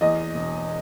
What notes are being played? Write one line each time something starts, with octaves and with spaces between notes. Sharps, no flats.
E2 D#5
E1